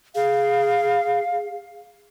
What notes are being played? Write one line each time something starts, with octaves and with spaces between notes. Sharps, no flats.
G#4 F5